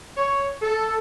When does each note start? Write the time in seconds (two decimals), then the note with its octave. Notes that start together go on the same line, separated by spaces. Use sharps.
0.17 C#5
0.61 A4